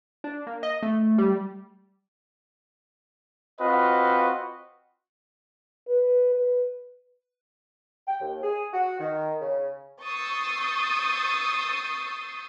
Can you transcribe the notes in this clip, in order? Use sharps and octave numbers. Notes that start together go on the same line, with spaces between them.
D4
A#3
D#5
A3
G3
C4 F4 F#4 B4 D#5
B4
B4
G5
D#2
G#4
F#4
D#3
C#3
C#6 D#6 E6 G6 A6 C7